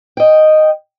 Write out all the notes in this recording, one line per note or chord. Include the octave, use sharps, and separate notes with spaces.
D#5 G5